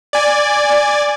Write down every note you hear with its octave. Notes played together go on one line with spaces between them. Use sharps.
D5 G#5